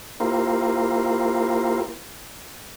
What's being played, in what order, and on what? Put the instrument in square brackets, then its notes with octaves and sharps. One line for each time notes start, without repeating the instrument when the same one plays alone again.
[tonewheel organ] A#3 E4 F4 G4 A#4 C5